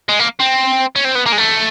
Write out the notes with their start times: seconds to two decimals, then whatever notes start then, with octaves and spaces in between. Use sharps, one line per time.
0.09 G#3
0.20 A#3
0.40 C4
0.96 C#4
1.05 C4
1.15 B3
1.26 A#3
1.32 G#3
1.38 A3